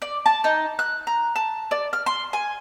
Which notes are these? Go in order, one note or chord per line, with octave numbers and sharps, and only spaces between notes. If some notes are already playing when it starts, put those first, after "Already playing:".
D5
A5
D#4
F#6
A#5
A5
D5
F6
C6
G#5